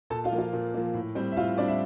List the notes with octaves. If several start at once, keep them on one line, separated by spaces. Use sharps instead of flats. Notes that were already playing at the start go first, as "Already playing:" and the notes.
A#2 A4 A5
F4 F5
F3 A#3
F4 F5
A#2
F3 A#3
A2
G3 C4
E5
A2 F4 F5
G3 C4 D4 D5
E4 E5